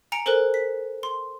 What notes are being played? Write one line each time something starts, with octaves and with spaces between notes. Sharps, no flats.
G#5 A#5 C#7 D7 F7
A4 A#4 C5 G#5 F#6
B6
C6